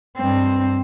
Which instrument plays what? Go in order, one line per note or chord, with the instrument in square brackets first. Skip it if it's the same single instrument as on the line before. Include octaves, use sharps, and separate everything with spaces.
[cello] G2 C4